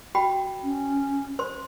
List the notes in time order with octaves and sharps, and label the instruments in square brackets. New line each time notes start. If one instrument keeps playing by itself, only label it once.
[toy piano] F#4 G5 B5
[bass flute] C#4
[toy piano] C5 C6